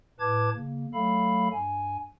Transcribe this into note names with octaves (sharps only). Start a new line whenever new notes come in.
A2 B4 A5 D6 G#6
C#3 A#3
F#3 A3 A4 F5 B5
G2 G#5